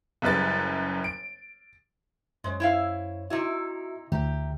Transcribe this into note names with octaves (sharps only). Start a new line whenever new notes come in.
F#1 F#2 G3 B4 A6
D7
F#2 G#3 C5 C#5
E4 E5 F5
C3 D#4 E4 F#4 E5
D2 G4 E5 A#5